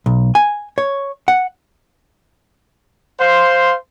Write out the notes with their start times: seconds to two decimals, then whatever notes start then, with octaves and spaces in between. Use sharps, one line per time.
0.06 B1
0.35 G#5
0.78 C#5
1.28 F#5
3.19 C5 F5 C6